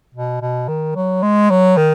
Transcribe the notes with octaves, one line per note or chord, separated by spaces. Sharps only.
B2
B2
D#3
F#3
G#3
F#3
D#3